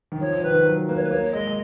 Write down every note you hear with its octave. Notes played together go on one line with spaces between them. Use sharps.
D#3
F3 C#5
F3
D#3 B4
D#3
F#3
A#3 B4
C#5
B4
A#3 C#5
G#3 D#5
G#3